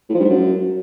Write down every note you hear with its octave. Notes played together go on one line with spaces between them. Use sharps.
A2
F3
G2
G#2
F#2